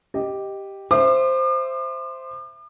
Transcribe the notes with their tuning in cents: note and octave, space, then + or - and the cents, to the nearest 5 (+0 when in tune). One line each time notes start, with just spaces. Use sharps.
G4 +0 D#5 +0
C5 +0 E5 +15 D6 +45